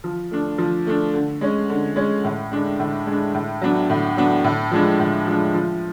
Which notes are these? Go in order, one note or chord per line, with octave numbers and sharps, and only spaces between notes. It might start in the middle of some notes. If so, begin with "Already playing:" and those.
F3
A3 D4
F3
A3 D4
D3
G#3 C#4
D3
G#3 C#4
A2
G#3 D4
A2
G#3 D4
A2
F#3 B3 D4
A2
F#3 B3 D4
A2
F3 G#3 D4
A2
F3 G#3 D4
F3